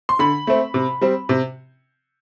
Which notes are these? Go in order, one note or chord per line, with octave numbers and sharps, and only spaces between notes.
C6
D3 B5
A3 C4
C3
G3 C4
C3